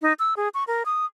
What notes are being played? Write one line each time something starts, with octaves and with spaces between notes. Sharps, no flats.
D#4
E6
G#4
C#6
A#4
D#6